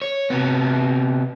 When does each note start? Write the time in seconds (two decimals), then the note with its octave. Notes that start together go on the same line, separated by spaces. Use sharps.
0.02 C#5
0.30 C3 B3